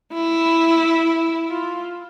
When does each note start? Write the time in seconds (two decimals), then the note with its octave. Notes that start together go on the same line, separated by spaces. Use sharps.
0.14 E4
1.49 F4